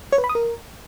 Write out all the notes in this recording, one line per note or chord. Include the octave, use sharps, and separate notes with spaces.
C#5
B4
B5
D#6
A#4